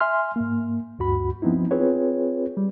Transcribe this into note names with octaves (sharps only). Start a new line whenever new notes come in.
E5 G#5 C6 F6
G#2 A#3
D2 G2 F#4 B5
F3 B3 C4 D#4 E4
C4 F4 G#4 B4 C#5
G3